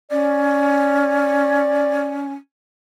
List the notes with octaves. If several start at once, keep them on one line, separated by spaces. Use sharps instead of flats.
C#4 D5